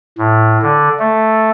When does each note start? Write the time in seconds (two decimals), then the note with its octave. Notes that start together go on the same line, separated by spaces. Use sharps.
0.18 A2
0.63 D3
0.99 A3